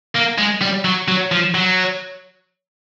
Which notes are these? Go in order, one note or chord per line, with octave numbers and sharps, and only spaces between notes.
A#3
G#3
G3
F#3
F#3
F3
F#3